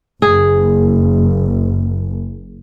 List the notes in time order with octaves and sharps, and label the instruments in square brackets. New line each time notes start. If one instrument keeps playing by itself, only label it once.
[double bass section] F#1 [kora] G#4